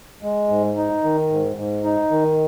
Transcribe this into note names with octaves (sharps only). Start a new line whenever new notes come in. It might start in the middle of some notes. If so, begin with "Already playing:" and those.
G#3
G#2
D#4
D#3
G#2
G#2
D#4
D#3